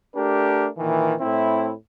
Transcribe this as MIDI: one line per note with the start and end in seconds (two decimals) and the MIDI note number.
0.15 0.67 57
0.15 0.67 62
0.15 0.67 67
0.15 0.67 70
0.79 1.15 46
0.79 1.15 51
0.79 1.15 52
1.21 1.72 45
1.21 1.72 60
1.21 1.72 64